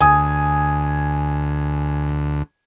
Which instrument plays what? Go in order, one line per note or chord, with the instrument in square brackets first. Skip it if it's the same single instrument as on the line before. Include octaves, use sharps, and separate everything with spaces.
[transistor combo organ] D2 [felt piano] G#5 D#6